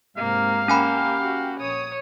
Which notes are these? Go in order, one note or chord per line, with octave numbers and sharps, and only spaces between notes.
G#2 C3 A#3 C4 F5
A#3 C#4 G4 G#5 B5
F#4
A#1 C#5 D#6